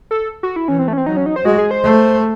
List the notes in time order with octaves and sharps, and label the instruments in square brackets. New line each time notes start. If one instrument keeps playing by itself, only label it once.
[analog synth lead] A4
F#4
E4
[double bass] E3 [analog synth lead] C#4
[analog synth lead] C4
A3
C#4
C4
[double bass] F#3 [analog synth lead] D#4
[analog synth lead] C#4
D#4
C5
[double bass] G#3 [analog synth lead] F#4
[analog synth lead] G#4
C5
[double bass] A3